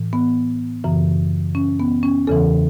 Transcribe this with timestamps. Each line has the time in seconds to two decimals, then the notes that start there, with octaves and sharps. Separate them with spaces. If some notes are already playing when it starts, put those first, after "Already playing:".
Already playing: A2 E3
0.13 B3
0.84 F#2 C#3 E3
1.55 C#4
1.80 B3
2.03 C#4
2.27 E2 C#3 E3 A4